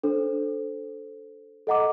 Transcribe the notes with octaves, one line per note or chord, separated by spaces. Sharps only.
D4 A4 C5
A4 D#5 F#5 A#5 D6